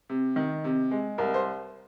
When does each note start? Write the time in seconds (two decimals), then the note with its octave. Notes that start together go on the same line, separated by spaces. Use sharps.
0.09 C3
0.36 D#3
0.64 C3
0.91 G#3
1.18 C2 A#4
1.34 C5